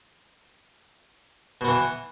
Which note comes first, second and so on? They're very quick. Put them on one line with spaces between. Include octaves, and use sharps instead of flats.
B2 B3 E3